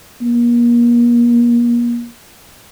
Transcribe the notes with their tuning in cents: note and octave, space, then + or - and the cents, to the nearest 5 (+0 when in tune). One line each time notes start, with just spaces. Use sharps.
A#3 +35